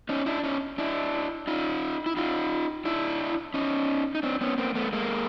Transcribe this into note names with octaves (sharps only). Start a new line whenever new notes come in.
C#4 D#4
D4 E4
C#4 D#4
D4 E4
D#4 F4
E4
D#4 F4
D4 E4
C#4 D#4
D#4
C4 D4
B3 C#4
A#3 C4
A3 B3
G#3 A#3